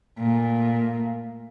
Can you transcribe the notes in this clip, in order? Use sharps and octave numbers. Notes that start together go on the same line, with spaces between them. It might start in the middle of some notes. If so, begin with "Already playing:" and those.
A#2 A3